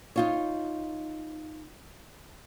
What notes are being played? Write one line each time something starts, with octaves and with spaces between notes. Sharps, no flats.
D#4 F4 C#5